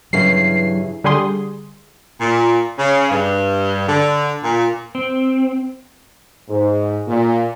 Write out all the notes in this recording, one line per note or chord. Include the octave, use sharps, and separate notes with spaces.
G2 C#3 E3 F#3 G3 C7
D3 G3 G4 G#4 C6 D#6
A#2
C#3
G2
D3
A#2
C4
G#2
A#2